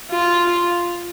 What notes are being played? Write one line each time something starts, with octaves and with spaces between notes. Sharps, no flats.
F4